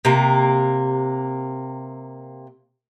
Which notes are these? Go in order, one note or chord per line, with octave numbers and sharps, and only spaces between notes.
C3 A#3